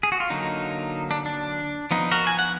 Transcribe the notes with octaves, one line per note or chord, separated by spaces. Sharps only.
G#4
F#4
F4
D3 F#3 A#3 D#4
D4
D4
F3 B3 D#4
F#4 A#4
G#5
F#5